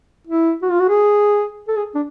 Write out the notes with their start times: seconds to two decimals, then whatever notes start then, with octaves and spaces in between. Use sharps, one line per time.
0.27 E4
0.63 F#4
0.71 F4
0.80 F#4
0.89 G#4
1.68 A4
1.76 G#4
1.95 D4